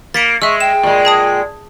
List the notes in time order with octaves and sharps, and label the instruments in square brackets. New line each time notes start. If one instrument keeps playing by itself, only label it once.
[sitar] A#3 [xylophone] A6 B6 C#7
[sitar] G#3 [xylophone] E5 E6 [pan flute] C#6
[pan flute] G5 [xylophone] E7
[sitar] A#2 G#3
[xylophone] G#4 A5 D#6